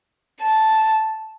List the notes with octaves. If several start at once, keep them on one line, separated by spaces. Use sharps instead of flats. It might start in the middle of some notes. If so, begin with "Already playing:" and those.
A5